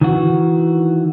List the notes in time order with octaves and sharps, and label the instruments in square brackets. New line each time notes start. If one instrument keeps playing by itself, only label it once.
[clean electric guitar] D#3 E3 F#4